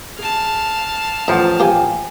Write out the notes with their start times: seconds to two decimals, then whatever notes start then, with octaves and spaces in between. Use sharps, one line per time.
0.19 G#4 F5 A5
1.28 A1 F3 E5 F#5 A#5
1.60 A#3 G4 G5 G#5